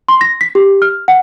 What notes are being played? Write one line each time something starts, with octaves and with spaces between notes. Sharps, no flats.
C6
A#6
B6
G4
F6
F#5